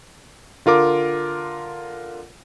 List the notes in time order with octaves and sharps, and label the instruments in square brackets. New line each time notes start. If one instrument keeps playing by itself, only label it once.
[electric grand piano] D3 F4 A#4 D6